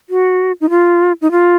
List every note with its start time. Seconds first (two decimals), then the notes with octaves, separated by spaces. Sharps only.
0.10 F#4
0.61 D#4
0.70 F4
1.21 D#4
1.31 F4